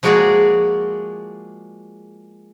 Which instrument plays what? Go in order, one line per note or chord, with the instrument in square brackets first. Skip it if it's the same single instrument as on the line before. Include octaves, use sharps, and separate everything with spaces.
[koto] F3 G#3 A#3 F#4 G#4 D5